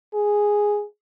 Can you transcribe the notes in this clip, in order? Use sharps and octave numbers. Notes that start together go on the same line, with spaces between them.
G#4